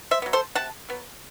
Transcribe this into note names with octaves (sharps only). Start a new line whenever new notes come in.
C5 E5
F#3 B3
A4 C5
C3 F#5 A5
F#3 B3